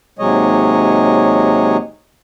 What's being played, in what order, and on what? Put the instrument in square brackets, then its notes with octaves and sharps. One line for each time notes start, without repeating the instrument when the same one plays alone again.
[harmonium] D#2 C3 F#3 G#3 C#5 D#5